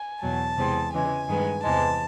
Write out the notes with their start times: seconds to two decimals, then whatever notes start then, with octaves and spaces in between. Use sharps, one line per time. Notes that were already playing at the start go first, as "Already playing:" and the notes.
Already playing: G#5
0.22 E2 B2 F#3 A5
0.57 E2 C3 E3 G#3 C4
0.93 C#3 E3 G#3 G#5
1.28 G2 D#3 G#3 B3
1.63 E2 C3 E3 G#3 A5